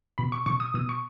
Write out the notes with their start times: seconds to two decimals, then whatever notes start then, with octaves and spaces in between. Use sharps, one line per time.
0.18 B2 B5
0.32 C#6
0.46 B2 C#6
0.60 D#6
0.74 B2 D#6
0.89 C#6